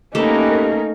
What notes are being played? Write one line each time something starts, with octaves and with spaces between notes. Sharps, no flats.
A3 A#3 C#4 D#4 G4 A#4 B4